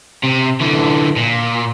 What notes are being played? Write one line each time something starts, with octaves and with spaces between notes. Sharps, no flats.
C3
D3 E3
A#2